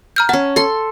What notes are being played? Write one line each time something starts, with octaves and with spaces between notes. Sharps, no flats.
A#5 F6 G6
C#4 F#5 A5
A4 C6